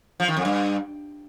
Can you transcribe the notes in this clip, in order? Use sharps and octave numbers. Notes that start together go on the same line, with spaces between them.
F3
D#3
F2
G2